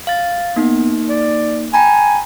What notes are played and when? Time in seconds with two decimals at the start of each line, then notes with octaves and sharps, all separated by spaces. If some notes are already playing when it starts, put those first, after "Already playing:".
0.07 F5 A6
0.56 A#3 B3 D#4
1.09 D5
1.74 G5 G#5 A#5 B5